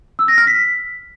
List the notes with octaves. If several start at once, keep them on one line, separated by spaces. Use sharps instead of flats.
E6
A#6
F6
B6